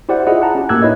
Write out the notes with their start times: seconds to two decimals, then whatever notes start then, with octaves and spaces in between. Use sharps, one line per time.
0.09 E4 G4 C5 D5 F#5
0.27 E4 F4 G#4 D#5 F#5
0.42 F#5 A5 A#5
0.55 C#4 G4
0.69 A2 A#3 G4 E6 F#6 G#6
0.82 D#4 E4 B4 C#5 D#5